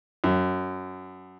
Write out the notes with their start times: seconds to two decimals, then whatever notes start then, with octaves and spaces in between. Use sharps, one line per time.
0.24 F#2